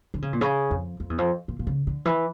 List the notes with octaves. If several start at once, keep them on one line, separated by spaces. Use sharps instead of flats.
D3
C#3
A#2
C#3
F2
F2
E2
F2
A#2
A#2
C#3
D3
E3